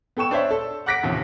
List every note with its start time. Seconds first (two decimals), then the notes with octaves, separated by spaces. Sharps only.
0.17 B3 A4 G5 C#6 E7
0.31 D4 C5 C#5 E5
0.51 A4
0.86 F#5 D6 F#6 A#6 B6 D7
1.03 A1 D#2 C3 F3